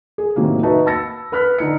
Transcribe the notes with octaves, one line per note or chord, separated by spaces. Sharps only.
G#4
A2 C3 D#3 F#3 A#3
D#4 F#4 B4 E5 A5
A5 B5 E6 A6 A#6 C#7
B4 B5 F6 F#6 B6
D3 D#4 C#7